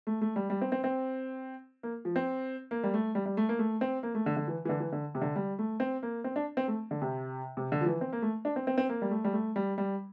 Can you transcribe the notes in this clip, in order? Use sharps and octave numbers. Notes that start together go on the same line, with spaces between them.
A3
A3
G3
G3
C4
C4
C4
A#3
F3
C4
A#3
G3
A3
G3
G3
A3
A#3
A3
C4
A#3
A3
D3
D3
E3
E3
D3
E3
D3
C3
D3
G3
A3
C4
A#3
C4
D4
C4
A3
D3
C3
C3
D3
F3
E3
C4
A#3
A3
D4
C4
C4
C4
A#3
G3
A3
G3
A3
G3
G3